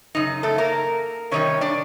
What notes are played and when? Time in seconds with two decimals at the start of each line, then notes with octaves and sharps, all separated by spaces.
0.15 F#2 C#3 D#4
0.43 A3 A4
0.58 A#3 A#4
1.31 C3 D#3 G3 C#4 C#5
1.61 D4 D5